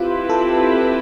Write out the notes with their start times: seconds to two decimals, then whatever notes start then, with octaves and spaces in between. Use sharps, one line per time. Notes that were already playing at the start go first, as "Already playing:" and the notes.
Already playing: C4 E4 F4 G4 B4
0.30 A4